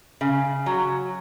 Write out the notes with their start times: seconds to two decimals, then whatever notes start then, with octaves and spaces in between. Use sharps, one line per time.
0.21 C#3
0.66 F#3